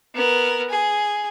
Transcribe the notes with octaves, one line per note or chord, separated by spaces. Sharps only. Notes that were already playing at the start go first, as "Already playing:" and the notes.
B3 A#4
G#4